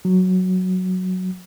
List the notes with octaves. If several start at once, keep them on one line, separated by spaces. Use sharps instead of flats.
F#3